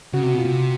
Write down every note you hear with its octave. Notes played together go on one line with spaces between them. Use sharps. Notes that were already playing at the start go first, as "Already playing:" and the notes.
C#3 F#4
C3
B2 F4
C3